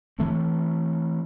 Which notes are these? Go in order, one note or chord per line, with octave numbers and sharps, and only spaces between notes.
E3 A3 C4